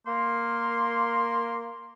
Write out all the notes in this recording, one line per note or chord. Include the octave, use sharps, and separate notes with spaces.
A#3 C6